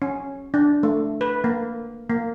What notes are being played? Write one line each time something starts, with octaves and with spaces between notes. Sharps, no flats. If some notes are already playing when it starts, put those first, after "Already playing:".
C#4
D4
A3
B4
A#3
A#3